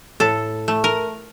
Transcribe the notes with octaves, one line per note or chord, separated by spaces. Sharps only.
A2 A4
A3
A#4